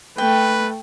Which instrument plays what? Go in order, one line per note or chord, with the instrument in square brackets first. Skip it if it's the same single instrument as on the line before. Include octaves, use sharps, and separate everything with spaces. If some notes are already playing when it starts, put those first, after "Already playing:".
[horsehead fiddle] A3 [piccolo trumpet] B4 [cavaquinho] G5